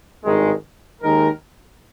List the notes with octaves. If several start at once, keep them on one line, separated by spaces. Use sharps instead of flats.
G#1 G2 D#3 G#3
D#2 D#3 G#3 D#4 A#4